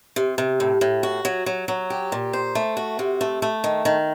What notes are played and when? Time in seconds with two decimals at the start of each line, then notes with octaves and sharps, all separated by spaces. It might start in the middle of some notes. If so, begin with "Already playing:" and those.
0.16 C3
0.38 C3
0.60 A2
0.81 A2
1.03 F#4
1.25 F#3
1.46 F#3
1.68 F#3
1.90 G4
2.12 A#2
2.33 C5
2.55 A3
2.77 F#4
2.99 C3
3.21 A3
3.42 A3
3.64 D#3
3.85 D#3